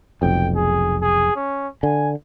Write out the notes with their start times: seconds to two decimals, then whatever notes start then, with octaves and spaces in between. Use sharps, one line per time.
0.22 F1 B1 F2 G5
0.55 G#4
1.01 G#4
1.36 C#4
1.83 D3 G#5